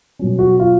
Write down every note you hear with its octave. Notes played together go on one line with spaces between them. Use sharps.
B2 F#3 C#4
F#4
F4